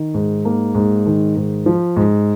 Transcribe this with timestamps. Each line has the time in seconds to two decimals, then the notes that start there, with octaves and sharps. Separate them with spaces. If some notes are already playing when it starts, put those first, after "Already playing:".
Already playing: D#3
0.14 G#2
0.45 A#3
0.75 G#2
1.06 D#3
1.37 G#2
1.66 F3
1.96 G#2